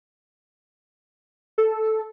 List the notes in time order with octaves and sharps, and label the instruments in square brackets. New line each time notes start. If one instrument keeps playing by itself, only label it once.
[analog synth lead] A4